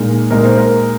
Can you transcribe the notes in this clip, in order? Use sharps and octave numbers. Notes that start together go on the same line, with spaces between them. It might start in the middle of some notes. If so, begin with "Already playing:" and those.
Already playing: A#2 G#3 D#4 A#4
A#2 G#3 D#4 A#4
C5
A#4